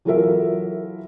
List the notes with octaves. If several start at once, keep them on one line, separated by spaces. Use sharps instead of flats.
E3 F#3 F4 A4 A#4 E5